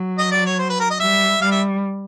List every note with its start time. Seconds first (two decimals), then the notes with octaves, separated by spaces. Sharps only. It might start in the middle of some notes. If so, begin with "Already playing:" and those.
Already playing: F#3
0.18 D#5
0.31 D5
0.46 C#5
0.59 C5
0.69 B4
0.80 A#4
0.90 D#5
1.00 G3 E5
1.41 G3 F5
1.51 E5